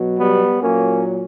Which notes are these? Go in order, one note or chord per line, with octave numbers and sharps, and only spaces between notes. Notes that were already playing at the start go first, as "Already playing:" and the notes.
Already playing: B2 F#3
G3 B3
A#2 F#3 A#3 C#4